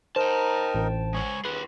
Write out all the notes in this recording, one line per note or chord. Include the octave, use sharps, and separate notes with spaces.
D#4 A#4 C5 G5 A5
A1
G#3 C#5 G#5 C#6
D#2 F4 G#4 B4